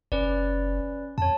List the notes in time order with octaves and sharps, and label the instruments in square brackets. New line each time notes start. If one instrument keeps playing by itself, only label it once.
[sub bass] F#1 [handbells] C#4 B4 D5
[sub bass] F2 [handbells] C#5 A5